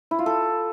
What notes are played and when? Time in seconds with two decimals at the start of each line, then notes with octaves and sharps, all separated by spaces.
0.11 E4
0.19 F4
0.26 A4